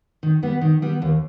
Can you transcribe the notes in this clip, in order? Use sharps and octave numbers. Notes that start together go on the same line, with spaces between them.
D#3
G3 B3
D#3
G3 B3
D#2